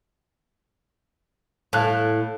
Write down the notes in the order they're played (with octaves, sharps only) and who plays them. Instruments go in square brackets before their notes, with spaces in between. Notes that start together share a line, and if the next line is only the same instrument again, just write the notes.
[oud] A2 [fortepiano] F5 A5 F#6